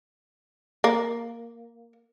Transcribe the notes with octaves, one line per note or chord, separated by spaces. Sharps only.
A#3